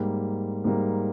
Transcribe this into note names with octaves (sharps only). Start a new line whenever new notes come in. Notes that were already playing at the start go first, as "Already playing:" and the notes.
Already playing: G#2 G3 A#3
G#2 G3 A#3